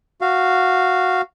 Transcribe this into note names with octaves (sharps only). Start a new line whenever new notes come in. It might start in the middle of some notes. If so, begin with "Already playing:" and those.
F#4 F5